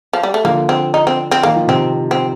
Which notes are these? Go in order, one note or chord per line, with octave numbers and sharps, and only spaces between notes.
F3
G3
A3
D3 F3 A#3
C4
D#4
C4
C4
D#3 A#3
F3
C3 D#3 C4
C4